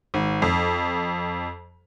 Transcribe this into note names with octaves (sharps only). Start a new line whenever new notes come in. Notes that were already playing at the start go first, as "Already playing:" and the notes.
G#1
F2